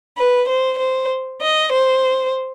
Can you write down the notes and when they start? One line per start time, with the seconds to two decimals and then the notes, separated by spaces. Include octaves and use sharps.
0.17 B4
0.48 C5
0.79 C5
1.42 D#5
1.73 C5